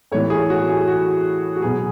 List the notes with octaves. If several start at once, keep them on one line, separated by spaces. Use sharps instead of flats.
A2 E3 B3 C#5
G#4
F#4
G#4
F#4
F#4
B2 F#3 B3 G#4